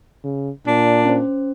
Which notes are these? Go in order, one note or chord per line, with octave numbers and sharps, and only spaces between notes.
C#3
A#2 D4
C#4 C5